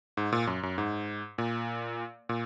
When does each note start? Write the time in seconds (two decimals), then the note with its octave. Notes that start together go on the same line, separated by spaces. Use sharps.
0.17 G#2
0.32 A#2
0.47 F#2
0.63 F#2
0.78 G#2
1.38 A#2
2.29 A#2